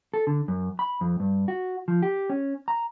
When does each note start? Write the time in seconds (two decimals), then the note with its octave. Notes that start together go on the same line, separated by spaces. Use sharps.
0.14 A4
0.27 D3
0.48 F#2
0.79 B5
1.01 F2
1.20 G2
1.48 F#4
1.88 F3
2.02 G4
2.30 C#4
2.68 A#5